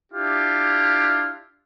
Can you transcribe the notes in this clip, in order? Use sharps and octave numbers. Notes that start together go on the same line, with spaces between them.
D4 E4 F4 G4